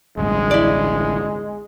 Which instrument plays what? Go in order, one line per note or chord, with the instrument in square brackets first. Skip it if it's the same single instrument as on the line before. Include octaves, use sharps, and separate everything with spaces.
[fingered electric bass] A1 D2 G2 [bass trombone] G#3
[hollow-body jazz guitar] E4 D5